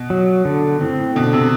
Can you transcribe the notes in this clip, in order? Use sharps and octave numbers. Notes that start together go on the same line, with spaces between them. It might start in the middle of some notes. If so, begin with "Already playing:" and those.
Already playing: B2
F#3
D3
A2 C4
A2
B2 D3
C3